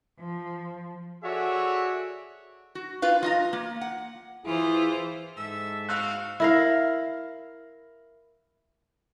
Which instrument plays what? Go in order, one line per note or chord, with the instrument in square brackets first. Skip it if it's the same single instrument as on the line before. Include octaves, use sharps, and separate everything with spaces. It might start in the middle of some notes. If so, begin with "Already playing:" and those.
[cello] F3
[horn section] F#4 G#4 A4 C#5 D5 E5
[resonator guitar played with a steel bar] F#4
F4 B4 F5
F4 D#5 A#5
A#3
F#5
[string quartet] E3 F4 C5 [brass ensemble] E4 G#4
[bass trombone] G#2 [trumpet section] A4 E5 [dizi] E6
[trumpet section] C4 F#4 [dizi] F5 [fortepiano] E6 F#6
[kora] E4 A#4 F5